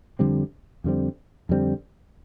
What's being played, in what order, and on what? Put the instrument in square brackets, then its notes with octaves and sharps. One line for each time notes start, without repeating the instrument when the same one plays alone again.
[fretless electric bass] F2 D3 G3 C4
F2 D3 G3 C4
F2 D3 G3 C4